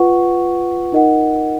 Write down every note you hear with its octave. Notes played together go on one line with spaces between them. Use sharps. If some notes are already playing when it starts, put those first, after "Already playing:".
Already playing: F4 B4 F#5 C#6
D#4 A#4 D#5 F#5